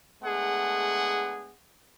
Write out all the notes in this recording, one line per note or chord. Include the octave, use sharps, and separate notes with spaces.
G#3 A3 B3 D4 G#4 F#5